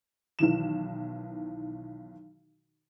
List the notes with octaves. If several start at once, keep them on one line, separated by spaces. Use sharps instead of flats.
B1 D#3 E3 E7